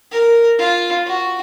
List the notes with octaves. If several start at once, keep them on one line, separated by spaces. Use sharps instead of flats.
A#4
F4
F#4